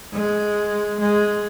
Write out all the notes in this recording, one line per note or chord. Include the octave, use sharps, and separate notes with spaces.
G#3
G#3